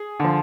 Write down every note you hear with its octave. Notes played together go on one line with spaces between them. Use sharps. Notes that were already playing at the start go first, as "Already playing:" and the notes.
Already playing: G#4
D3 F3